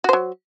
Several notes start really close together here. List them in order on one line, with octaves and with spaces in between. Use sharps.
F#4 C5 F#3